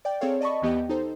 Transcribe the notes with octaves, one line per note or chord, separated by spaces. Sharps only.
D5 G5
C4 G#4 A4 C#5 F5
D5 D#5 A5 B5 C#6
D#2 E3 B3 G4 D#5 G5
D#4 A4 C5